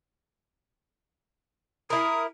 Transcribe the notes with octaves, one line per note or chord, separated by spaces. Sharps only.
E4 A#4 D#6